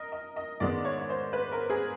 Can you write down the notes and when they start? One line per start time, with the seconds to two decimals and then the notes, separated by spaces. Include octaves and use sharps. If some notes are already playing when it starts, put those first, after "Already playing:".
Already playing: A#4 D#5
0.12 D#5
0.36 D#5
0.60 G#2 D#3 G#3 B3 D5
0.85 C#5
0.99 C#5
1.10 C5
1.33 B4
1.52 A#4
1.70 G#4